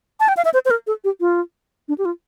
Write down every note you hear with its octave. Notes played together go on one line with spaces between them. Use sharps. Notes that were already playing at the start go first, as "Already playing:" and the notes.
A5
G5
F5
E5
C5
C5
A#4
A4
G4
F4
D4
G4
F4